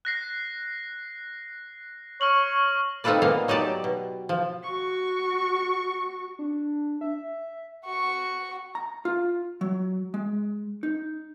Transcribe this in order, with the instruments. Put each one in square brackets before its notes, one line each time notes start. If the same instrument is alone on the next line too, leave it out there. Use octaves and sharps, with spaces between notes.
[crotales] F#6 A#6 C7
[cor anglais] C#5 [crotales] C#6 F6 F#7
[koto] C4 D#4 F4 A4 B4 D5
A#2 A#3 B3 F5
F#3 D#4 G4 D5 A5
B2
F3
[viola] F#4 C#6
[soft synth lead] D4
E5
[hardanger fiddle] F#4 C#6
[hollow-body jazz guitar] A#5
F4
F#3
G#3
D#4